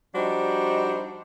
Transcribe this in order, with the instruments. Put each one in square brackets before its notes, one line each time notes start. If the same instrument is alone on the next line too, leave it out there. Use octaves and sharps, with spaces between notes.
[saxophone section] F3 G3 D4 D#4 F#4 C5